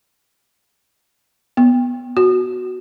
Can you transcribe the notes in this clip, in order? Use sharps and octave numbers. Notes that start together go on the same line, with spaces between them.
B3
F#4